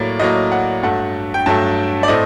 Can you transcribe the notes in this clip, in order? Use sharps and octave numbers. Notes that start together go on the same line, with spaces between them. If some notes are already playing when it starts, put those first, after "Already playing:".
Already playing: A2 F#3 A#3 D5
A2 F#3 A#3 D#5
F#5
G2 F#3 A3 F#5
G5
G2 F#3 A3 A5
D5
A2 A3 C4 D#5